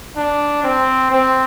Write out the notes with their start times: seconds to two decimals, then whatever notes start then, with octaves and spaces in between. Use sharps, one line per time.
0.17 D4
0.64 C4
1.10 C4